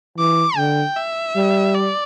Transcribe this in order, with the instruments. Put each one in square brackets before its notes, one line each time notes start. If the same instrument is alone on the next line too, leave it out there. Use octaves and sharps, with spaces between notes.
[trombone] E3 [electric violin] D6
[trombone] D3 [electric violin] G5
[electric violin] E5
[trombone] G3
[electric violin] D5